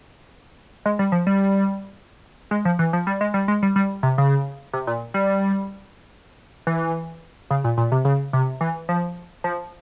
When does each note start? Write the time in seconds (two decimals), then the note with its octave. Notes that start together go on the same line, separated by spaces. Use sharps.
0.86 G#3
0.99 G3
1.12 F3
1.27 G3
2.51 G#3
2.65 F3
2.79 E3
2.93 F3
3.07 G3
3.21 G#3
3.34 G3
3.48 G#3
3.62 G3
3.76 G3
4.03 C3
4.18 C#3
4.73 C3
4.87 A#2
5.14 G3
6.67 E3
7.50 C#3
7.64 A#2
7.77 A#2
7.92 C3
8.05 C#3
8.33 C3
8.61 E3
8.89 F3
9.44 F3